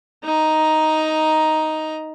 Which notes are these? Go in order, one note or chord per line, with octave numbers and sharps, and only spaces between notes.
D#4 A#5